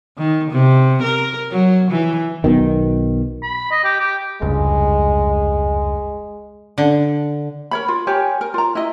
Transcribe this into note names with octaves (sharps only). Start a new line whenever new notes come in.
D#3
C3
A#4
F#3
E3
B1 B2 D#3
B5
D#5
G4
G4
F1 C#2 G2 G#3
D3
A#4 C#5 B5
F4
G4 A#4 C#5 G#5
A#4
F4 A#5
E4 D#5